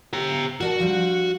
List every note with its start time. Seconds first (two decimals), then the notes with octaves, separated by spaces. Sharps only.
0.13 G4 A#5
0.61 F#4 A#4 D5 A5
0.80 F3 G3 D4